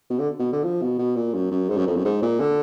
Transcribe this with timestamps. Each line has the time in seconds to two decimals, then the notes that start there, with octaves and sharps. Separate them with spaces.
0.10 B2
0.20 D3
0.39 B2
0.52 D3
0.64 F3
0.82 B2
0.99 B2
1.16 A#2
1.34 F#2
1.51 F#2
1.70 G#2
1.77 F#2
1.87 F2
1.96 F#2
2.05 G#2
2.22 A#2
2.40 D3